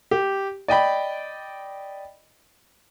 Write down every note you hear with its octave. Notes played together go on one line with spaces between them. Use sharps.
G4
D5 D#5 G5 B5